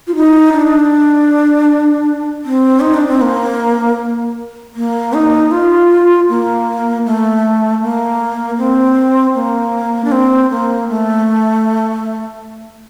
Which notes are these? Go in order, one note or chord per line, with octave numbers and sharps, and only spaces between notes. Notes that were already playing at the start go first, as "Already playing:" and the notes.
F4
D#4
D4
C4
D#4
D4
C4
A#3
A#3
D#4
F4
A#3
A3
A#3
C4
A#3
D4
C4
A#3
A3